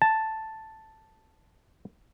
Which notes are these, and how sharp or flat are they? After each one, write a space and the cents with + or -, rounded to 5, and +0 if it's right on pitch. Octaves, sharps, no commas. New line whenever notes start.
A5 +0